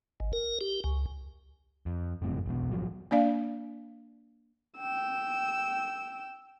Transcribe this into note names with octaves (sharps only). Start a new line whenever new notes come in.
G#1
A#4
G4
C#2
F2
F#1 F2 A2 C3
B1 E2 B2
G#1 F3 F#3
A#3 D4 D5 F5
G5 E6